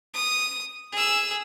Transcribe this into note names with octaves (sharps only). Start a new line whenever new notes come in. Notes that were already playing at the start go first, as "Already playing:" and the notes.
D#6
G#4 E6